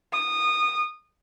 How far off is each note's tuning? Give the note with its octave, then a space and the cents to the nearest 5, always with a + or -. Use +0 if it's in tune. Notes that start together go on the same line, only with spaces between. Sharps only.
D#6 -20